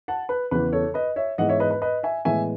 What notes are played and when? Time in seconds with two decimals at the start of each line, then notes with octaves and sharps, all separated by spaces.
0.08 F#5 A5
0.29 B4
0.51 E2 C#3 E3 B4
0.72 A4 C#5
0.94 B4 D#5
1.16 C#5 E5
1.38 G#2 E3 G#3 B3 D#5 F#5
1.49 C#5 E5
1.60 B4 D#5
1.71 B4
1.82 B4 D#5
2.03 E5 G#5
2.25 A2 E3 G#3 B3 E5 G#5